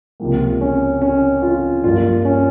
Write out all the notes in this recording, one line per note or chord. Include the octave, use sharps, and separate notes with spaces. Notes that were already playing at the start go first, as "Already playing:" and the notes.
C#2 C3 F3 A#3
C#4
C#4
F4
G2 F3 A#3 F4
C#4